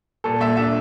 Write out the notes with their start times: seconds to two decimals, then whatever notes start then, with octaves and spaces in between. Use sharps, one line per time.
0.24 A#2 A4
0.41 A#2 E5
0.57 D4 E5